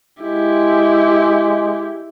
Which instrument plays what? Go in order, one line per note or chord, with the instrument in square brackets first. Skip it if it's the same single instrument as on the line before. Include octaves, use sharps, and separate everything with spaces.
[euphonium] G#3 [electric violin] E4 G4